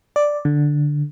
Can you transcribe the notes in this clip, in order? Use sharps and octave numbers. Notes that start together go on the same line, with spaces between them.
D5
D3